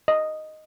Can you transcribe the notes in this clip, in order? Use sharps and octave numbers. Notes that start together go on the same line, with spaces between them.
D#5